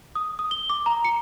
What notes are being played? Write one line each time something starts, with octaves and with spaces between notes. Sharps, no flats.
D#6
D#6
G7
D6
A#5
C#7